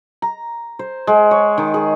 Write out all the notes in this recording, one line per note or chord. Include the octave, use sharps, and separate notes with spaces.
A#5
C5
G#3
C#5
D#3
G#4